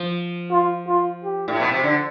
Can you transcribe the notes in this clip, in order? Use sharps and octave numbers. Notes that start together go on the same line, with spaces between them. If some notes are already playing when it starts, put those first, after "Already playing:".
Already playing: F3
F4
F4
G4
A2
B2
C3
D3